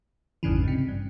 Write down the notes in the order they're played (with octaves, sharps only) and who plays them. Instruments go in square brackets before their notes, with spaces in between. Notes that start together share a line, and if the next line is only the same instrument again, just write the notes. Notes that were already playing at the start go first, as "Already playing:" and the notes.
[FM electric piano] G#1 E2 G2 C#3 E3
G#2 C3
G2